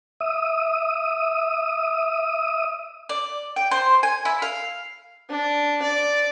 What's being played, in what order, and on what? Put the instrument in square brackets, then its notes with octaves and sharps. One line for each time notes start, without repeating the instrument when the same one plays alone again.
[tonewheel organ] E5 D#6
[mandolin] D5
G5
C5
G#5
E4
F5
[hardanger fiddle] D4
D5